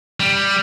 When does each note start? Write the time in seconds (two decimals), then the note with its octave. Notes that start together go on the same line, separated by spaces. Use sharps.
0.20 G3